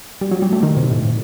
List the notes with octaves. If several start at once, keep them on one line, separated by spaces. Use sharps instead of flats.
G3
F#3
G3
A3
D#3
C3
A2
A#2